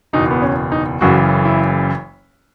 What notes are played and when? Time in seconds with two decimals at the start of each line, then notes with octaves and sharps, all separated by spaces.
0.13 F#1 E2 B2 D#4
0.31 B3
0.42 C#4
0.72 D#4
1.01 F#1 F#2 C#3 E3 F#4
1.45 E4